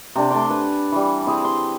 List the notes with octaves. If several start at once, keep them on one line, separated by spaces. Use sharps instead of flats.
C3 D4 C5
A3 D4 C6 D6
B4 G#5
E3 G3
C4 E4 G#4
C6